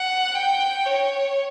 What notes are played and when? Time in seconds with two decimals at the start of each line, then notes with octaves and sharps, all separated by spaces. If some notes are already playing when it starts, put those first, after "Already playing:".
Already playing: F#5
0.35 G5
0.86 C#5